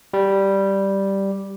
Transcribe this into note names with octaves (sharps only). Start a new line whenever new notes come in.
G3